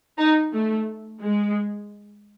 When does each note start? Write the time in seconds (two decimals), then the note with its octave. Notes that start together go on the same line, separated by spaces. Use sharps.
0.18 D#4
0.53 A3
1.21 G#3